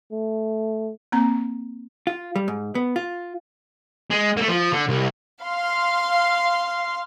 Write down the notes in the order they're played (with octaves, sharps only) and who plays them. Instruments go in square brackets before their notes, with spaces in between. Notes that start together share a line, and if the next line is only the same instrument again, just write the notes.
[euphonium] A3
[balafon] A#3 C4 A#5
[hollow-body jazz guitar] F4
G3
G#2
B3
F4
[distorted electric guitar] G#3
A3 A#3
F3
D3
C2
[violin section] F5 C6